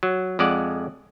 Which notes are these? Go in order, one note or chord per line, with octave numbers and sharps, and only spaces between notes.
F#3
F2 G#3 D5 F#5